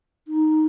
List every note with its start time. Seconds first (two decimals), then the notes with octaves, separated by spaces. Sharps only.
0.28 D#4